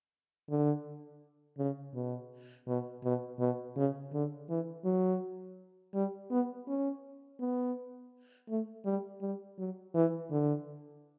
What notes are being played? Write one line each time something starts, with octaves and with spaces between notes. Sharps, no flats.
D3
C#3
B2
B2
B2
B2
C#3
D3
E3
F#3
G3
B3
C#4
B3
A3
G3
G3
F#3
E3
D3